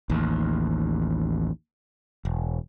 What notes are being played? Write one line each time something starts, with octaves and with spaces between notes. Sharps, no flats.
A1 D#2
E1